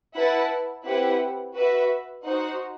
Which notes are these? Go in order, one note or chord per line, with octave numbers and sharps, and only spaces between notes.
E4 B4 F#5 A5
C4 E4 G4 B4 F#5
F#4 B4 E5
D#4 F#4 C5 F#5